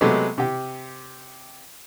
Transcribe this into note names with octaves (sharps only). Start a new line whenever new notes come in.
C3 F#3 G#3 A3 B3
C3 G4